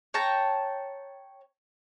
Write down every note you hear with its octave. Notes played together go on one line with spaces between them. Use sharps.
C#5 G5 A5 A#5